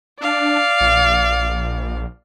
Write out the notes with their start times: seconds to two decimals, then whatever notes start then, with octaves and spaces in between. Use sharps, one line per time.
0.21 D4 D5 F5
0.81 A#1